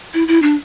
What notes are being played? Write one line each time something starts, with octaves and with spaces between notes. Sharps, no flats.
E4
E4
D4